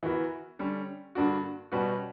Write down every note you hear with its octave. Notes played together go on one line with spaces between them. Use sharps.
E3 B3 F#4 A#4
D3 G3 C#4
G2 D3 A#3 D4 F#4
B2 G3 C#4 F#4 B4